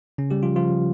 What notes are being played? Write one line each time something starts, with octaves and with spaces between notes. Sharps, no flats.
C#3 C#4
G3 G4
F3 F4
F3 F4